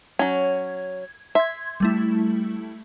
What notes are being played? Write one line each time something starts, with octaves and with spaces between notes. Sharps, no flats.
F#3 C#4 G#6
E5 C6 G#6
G3 A3 E4